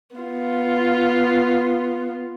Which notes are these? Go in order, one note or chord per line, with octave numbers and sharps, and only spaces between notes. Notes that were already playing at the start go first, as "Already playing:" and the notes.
B3 F4